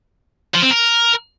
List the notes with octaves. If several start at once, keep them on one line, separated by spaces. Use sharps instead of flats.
F3
C4
A#4